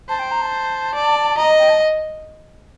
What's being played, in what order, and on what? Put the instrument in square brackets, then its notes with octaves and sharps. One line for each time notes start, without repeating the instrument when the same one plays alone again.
[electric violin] C5 [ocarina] A5
[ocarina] G5
A#5
A5
[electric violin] D5
[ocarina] A5
[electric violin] D#5 [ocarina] A#5
[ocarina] G5
A5